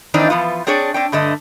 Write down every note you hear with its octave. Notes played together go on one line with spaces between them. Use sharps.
D#3 E3 C4 D4 D#4 D5
E3 F3 B3 F4
C4 D4 G#4 C#5 D5
C4 D4 G5
G2 D3 A3 D#5